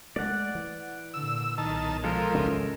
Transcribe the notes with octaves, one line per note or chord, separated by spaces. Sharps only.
G#3 A3 D5 F#5
E3
A#2 D3 E6
B1 D#3 A5
F3 G#3 A4 A#4
G#1 C#2 E3 C#4